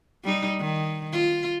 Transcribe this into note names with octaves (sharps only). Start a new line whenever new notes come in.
G3 D#4
D#3
F4